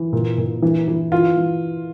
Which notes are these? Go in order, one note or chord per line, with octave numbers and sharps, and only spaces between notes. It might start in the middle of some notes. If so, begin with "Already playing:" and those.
Already playing: E3
A#2
A#2
E3
E3
E3 F4
E3